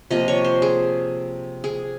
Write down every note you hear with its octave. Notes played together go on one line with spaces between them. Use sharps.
C3 F3 A#3 D#5
C#5
C5
G#4
G#4